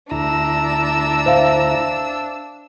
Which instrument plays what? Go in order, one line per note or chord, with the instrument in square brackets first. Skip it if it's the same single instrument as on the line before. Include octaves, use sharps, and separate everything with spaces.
[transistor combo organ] D2 E4 A#5 [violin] D4 E6
[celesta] C5 E5 F5